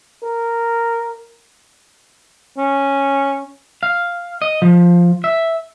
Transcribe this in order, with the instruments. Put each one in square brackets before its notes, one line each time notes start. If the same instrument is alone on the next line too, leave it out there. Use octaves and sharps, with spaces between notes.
[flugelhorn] A#4
[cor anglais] C#4
[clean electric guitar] F5
D#5
F3
E5